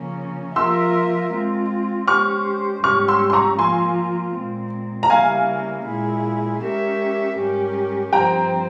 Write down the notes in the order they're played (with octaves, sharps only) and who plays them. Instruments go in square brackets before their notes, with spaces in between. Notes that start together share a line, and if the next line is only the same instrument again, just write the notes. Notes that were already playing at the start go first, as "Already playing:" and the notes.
Already playing: [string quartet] C#3 F3 A#3 C#4
[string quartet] F3 A#3 F4 A#4 E5 [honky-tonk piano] C6 E6
[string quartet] G#3 C4 F4
[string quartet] G#3 C#4 G4 C5 [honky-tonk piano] C#6 F6
[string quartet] G#2 G3 C#4 G4 [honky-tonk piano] C#6 F6
[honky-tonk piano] C6 E6
C6
A#5 C#6
[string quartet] F3 A#3 F4 [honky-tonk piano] G#5 C6
[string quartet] A#2 G#3 C4
[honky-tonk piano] A#5
[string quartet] C#3 G3 A#3 E4 [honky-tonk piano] F5 G#5
[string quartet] A#2 G#3 E4 G#4
G#3 C#4 G4 A#4 E5
G#2 G3 C#4 G4 A#4
[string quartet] G2 F3 C4 [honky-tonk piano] G5 A#5